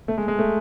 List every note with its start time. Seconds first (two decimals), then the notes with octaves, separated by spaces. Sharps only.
0.08 A3
0.18 G#3
0.28 G#3
0.39 A3